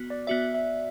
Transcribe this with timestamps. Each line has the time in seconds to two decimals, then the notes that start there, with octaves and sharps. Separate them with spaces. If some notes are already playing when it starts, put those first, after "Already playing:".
Already playing: B3 F#4
0.10 D5
0.27 B3 F#4 D5 E5
0.54 E5